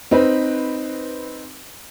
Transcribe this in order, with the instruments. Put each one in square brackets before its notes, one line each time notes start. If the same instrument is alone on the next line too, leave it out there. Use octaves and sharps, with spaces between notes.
[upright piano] C4 D#4 B4